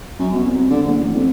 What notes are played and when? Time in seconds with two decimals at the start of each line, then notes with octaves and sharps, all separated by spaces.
0.19 F#2
0.33 B2
0.46 C2
0.71 D3
0.85 A#1
0.98 A1
1.15 F2